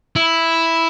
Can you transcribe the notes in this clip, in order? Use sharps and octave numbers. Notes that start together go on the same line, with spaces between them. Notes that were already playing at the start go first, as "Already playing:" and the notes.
E4